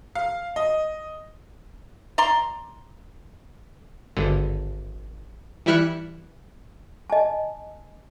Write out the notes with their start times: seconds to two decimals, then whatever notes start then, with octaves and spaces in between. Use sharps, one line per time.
0.15 F5
0.56 D#5
2.18 D5 A#5 C6
4.17 G#1 G2 D3
5.66 E3 G3 E4 F6 F#6 C#7
7.10 D#5 G#5 A5